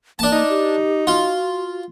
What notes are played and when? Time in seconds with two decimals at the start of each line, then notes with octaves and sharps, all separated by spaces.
0.19 A#3 D4 A5
0.33 D#4
0.49 G4
1.07 F4 F#4